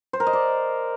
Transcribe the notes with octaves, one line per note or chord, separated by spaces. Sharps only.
C5
A#4
D#5
D5